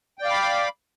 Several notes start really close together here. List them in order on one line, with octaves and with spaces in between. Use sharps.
G5 D5 F5 D6 B5